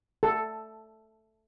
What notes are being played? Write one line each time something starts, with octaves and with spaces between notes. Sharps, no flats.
A4